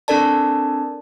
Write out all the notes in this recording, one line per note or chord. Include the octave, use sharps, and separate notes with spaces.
C4 D4 A4 A#4 D5 A5